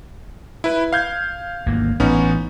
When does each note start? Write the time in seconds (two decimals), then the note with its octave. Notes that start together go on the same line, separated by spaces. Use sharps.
0.64 E4 B4
0.93 F5 G6 G#6
1.66 G#1 D2 A#3
2.00 A1 B3 C#4 D#4